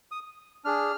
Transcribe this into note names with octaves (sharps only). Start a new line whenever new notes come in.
D#6
D4 G#4 F6